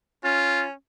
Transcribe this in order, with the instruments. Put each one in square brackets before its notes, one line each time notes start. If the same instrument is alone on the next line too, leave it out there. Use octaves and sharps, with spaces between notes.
[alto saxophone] C#4 [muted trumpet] F4